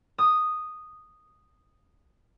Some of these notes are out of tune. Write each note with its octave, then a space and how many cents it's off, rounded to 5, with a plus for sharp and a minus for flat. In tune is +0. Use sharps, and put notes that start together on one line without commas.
D#6 -5